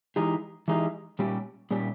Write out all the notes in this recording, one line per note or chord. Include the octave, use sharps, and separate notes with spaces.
E3 G#3 D#4 G4
E3 G#3 D#4 G4
A#2 G3 C#4 G4
A#2 G3 C#4 G4